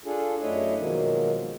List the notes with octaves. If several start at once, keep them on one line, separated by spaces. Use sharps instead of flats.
D4 F4 G#4 A4
F#2 A3 D4 E4 C#5 D#5
B2 D#3 F3 F#3 G#3 A#3